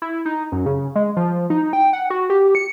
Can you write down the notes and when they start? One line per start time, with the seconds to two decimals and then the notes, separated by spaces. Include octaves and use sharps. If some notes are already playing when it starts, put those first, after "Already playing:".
0.02 E4
0.25 D#4
0.52 F#2
0.66 C#3
0.96 G#3
1.17 F3
1.50 D#4
1.73 G5
1.93 F#5
2.10 F#4
2.30 G4
2.55 C#7